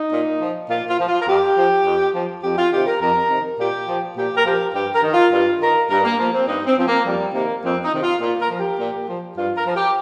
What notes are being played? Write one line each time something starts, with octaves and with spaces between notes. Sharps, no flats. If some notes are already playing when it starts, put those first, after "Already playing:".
Already playing: D#4
A#2
F3
A#2 F4
F4
F3
F4
A#4
F2 G4
F3
F2
F3
F2 G4
F4
C3 D#3 G4
A#4
F2 A#4
C3 D#3
A#2 G4
F3
A#2 G4
A#4
F3 G4
G2 G4
A#4
D#3
F4
G2 F4
D#3 A#4
G2 A#4
A#3
F3 A#3
C4
G2 D#4
C4
F3 C4
A#3
F2 G3
C3 D#3 A#3
F2 C4
D#4
C3 D#3
F4
A#2 F4
A#4
F3
G4
A#2
F3
G2 F4
A#4
F3
G4